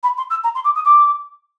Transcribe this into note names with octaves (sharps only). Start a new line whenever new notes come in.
B5
C6
E6
A#5
C6
D6
D#6
D6